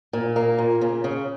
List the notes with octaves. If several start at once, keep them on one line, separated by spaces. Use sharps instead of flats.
A#2
A#3
A#2
C#3
C#3